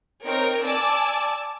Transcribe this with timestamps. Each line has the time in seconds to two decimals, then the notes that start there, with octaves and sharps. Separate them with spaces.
0.24 C4 D#4 A#4 C#5 D7
0.64 D5 G#5 A5 D6 E6